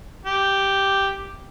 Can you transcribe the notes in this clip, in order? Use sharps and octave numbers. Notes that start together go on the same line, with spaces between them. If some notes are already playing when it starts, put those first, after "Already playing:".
G4